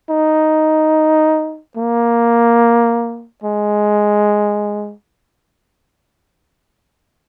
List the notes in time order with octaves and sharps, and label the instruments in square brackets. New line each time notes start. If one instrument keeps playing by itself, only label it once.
[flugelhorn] D#4
A#3
G#3